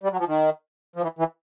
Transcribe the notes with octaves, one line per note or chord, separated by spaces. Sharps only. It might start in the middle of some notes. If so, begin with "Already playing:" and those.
G3
F#3
F3
D#3
F3
E3
E3